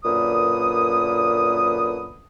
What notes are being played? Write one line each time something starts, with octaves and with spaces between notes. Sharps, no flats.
F#2 A#2 D3 B4 D#6